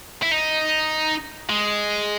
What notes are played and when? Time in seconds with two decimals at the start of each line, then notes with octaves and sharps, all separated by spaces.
0.23 E4
0.32 D#4
1.49 G#3